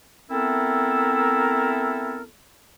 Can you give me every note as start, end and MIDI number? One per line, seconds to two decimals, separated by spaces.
0.29 2.22 57
0.29 2.22 59
0.29 2.22 60
0.29 2.22 64
0.29 2.22 69
0.29 2.22 70